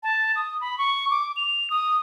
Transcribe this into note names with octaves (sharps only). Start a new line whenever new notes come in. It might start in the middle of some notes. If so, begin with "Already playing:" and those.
A5
D#6
B5
C#6
D6
F7
D#6